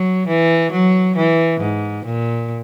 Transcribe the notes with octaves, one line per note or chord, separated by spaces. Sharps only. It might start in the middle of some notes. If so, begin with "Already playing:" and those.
Already playing: F#3
E3
F#3
E3
G#2
A#2